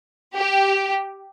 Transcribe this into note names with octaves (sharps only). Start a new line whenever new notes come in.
G4